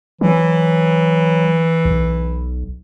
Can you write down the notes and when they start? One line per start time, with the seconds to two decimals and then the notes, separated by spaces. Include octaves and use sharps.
0.21 E3 F#3
1.85 B1